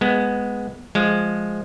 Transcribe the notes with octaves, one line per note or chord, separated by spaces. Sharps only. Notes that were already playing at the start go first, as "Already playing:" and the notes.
G#3 B3
F3 G#3